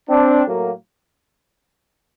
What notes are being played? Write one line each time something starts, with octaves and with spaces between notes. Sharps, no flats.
C4 D4
A2 F#3 A#3